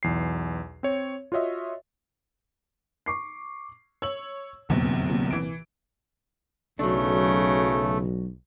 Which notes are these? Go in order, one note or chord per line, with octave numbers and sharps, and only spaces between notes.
B1 E2 C7
C4 C#5
F4 F#4 C#5 D#5 E5
C#6 D6 C7
C#5 E6 F#7
F1 A#1 E2 D3 F#3 B3
C2 A#2
E3 D7
B1 C#3 F#3 A3 D4